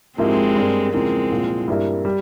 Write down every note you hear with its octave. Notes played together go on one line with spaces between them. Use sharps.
G#2 F3 G#3 A#3 C4 E4 G4
G2 G3 A#3
E2 C#3 F3 G#3 A#3 C4
C2 A#2 F3
G2 G3 A#3 E4 A#4
G3